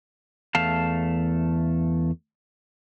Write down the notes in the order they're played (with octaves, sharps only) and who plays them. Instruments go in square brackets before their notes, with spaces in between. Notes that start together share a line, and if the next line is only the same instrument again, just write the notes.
[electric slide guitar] E2 A3 F5 A5